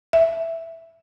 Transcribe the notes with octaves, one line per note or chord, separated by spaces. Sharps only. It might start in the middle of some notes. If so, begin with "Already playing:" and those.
E5